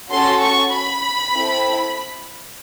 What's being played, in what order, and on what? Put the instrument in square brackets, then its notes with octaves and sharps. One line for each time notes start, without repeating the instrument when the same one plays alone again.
[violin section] C#4 F#4 A4 C6
C#6
B5
C4 E4 A4